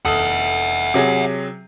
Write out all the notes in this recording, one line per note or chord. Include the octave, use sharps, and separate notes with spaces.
F1 A4 E5 F#5 D#6
C3 F#3 G#4